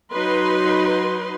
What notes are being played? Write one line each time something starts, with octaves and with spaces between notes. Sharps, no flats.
F#3 D#4 B4 C6